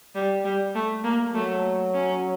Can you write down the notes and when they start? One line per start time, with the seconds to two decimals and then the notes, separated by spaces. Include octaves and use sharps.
0.15 G3
0.45 G3
0.75 A3
1.04 A#3
1.34 F#3 A3
1.94 C#4